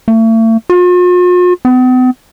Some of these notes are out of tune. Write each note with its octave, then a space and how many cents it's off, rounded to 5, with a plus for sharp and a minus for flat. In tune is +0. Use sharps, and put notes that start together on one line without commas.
A3 +40
F4 +45
B3 +45